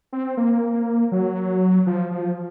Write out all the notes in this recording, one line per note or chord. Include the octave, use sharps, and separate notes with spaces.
C4
A#3
F#3
F3
F3